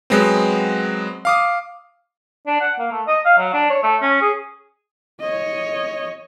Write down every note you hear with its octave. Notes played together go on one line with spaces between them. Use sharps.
F#3 G#3 B3 C4
F5 D6 D#6
D4
F#5
A#3
A3
D#5
F5
F#3
D4
C#5
A3
C#4
G#4
C#5 D#5